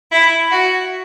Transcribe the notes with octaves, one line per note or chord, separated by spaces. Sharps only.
E4
F#4